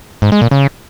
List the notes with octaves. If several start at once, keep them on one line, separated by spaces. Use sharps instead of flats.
G#2
G#3
A#2
C#3